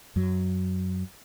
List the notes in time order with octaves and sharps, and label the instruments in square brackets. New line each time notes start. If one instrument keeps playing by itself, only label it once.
[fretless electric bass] F#2 F#3